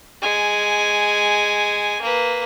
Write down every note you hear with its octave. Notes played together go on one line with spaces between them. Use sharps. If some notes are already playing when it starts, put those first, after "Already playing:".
G#3 G#5
A#3 B4